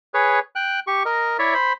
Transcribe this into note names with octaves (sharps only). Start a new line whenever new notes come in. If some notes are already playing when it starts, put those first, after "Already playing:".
G#4 B4 C#5
G5 F#6
G4 C#6
A#4 D#5
E4 C#5 D5 E5
C5 B5